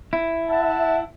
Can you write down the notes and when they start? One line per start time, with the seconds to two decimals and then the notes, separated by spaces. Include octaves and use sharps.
0.13 E4
0.49 E5 F#5 A5